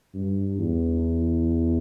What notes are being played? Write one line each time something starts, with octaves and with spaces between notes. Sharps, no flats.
G2
E2